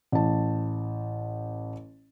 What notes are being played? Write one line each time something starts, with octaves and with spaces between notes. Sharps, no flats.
A1 A5